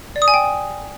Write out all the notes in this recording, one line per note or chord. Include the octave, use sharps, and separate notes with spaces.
D5
D#6
G#5
G5